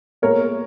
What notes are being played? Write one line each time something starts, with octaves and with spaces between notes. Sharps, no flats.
A#2 G#3 B3 A#4 C#5